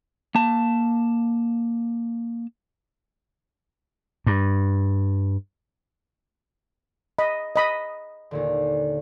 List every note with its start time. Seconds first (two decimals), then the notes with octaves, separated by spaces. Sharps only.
0.35 A#3 A5
4.27 G2
7.19 D#5 B5
7.56 D#5 B5 D#6
8.31 D#2 A#2 D3